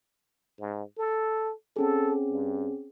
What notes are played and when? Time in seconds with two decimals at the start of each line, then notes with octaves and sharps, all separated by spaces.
0.60 G#2
0.98 A4
1.76 C4 C#4 G#4 A4
2.30 G2